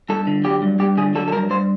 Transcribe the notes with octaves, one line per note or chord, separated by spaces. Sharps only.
G2 A4
D3
F#3 G4
G2
G2 G4
D3 G#4
F#3 A4
A4
G2 A#4
G2 C5